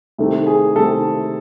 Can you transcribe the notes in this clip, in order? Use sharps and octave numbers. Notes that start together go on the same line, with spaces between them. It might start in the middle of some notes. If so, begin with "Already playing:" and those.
C2 C3 D#3 A3 C4
G#4
C2 C3 D#3 A3 C4 A4